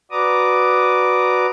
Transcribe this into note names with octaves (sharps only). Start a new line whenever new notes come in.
F#4 B4 D5 A#5 D6 D#6